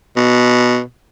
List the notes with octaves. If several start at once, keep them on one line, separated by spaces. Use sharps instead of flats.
B2